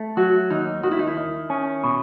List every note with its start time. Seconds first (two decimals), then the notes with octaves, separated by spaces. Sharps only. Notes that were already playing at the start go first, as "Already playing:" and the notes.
Already playing: A3
0.17 F#3 F#4
0.50 D#2 D#4
0.83 D#3 F#4
0.91 E4
0.99 D#4
1.07 E4
1.17 D#3
1.50 C#4
1.84 B2